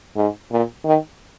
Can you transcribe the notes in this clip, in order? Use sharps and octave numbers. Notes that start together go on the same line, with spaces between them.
G#2
A#2
D#3